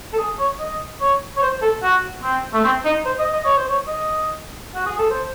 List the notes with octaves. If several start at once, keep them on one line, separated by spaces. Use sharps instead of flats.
A4
G#4
C#5
D#5
C#5
C#5
C5
A4
F#4
C4
A3
C4
D#4
C5
D#5
D#5
C#5
C5
C#5
D#5
F#4
G#4
A4
C5